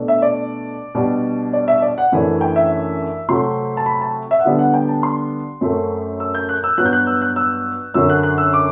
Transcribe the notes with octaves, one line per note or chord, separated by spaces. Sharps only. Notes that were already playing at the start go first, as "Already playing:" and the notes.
Already playing: B2 A3 D4
E5
D5
B2 G3 D4
D5
E5
D5
F#5
F#2 E3 A3 D4
G5
E5
C3 F#3 A3 C4 C6
A5
B5
A5
E5
F#5
D3 G3 B3 D4 E5
F#5
G5
A5
C6
F#2 F#3 A3 C4
E6
G6
F#6
E6
G2 F#3 B3 F#6
G6
F#6
E6
F#6
E6
F#2 D3 F#3 C4 E6
F#6
F#6
E6
D6